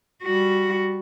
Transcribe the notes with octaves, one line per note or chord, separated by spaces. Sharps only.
G3 F#4